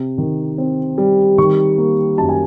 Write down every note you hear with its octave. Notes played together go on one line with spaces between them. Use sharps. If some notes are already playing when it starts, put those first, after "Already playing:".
Already playing: C3
D#3
C4
G3
D#3 C#6
A#3
F#2 A5
G#5